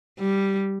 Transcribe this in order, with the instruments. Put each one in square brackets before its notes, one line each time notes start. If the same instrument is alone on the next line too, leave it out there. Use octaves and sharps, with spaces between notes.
[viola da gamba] G3